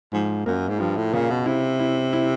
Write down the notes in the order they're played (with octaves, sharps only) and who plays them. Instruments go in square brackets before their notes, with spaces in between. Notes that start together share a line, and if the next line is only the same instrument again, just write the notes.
[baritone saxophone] G#2 [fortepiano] F3
[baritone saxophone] F#2 [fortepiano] A#3
[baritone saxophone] G#2
[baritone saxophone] G2 [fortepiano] F3
[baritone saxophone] A2
[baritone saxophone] A#2 [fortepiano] C#3
[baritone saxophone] B2
[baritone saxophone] C3 [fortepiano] E4
[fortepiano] E4
E4